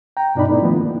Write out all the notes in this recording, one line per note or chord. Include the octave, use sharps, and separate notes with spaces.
G5 A#5
G2 B2 D4 D#4 D5 B5
A3 B3 E4
D#3 F3 B3
A#3